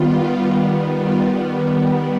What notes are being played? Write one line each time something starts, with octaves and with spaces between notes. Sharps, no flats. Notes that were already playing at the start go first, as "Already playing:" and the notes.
Already playing: D#3 G3 B3 F4
F4